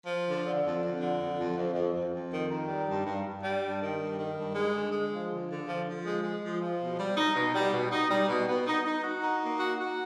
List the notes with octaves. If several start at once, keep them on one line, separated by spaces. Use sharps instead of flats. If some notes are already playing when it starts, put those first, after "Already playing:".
F3
D3
D3
F2
F2
D3
F2
F2
F2
F2
F2
F2
D#3
D#3
G3
G2
G2
G2
G3
G2
D#3
G2
D#3
G2
G#3
D3
G#3
F3
D3
D3
F3
F3
G#3
G#3
F3
F3
B2
G3
D#4
B2
G3
B2
D#4
G3
B2
B3
D#4
D#4
F#4
D#4
A#3
F#4
F#4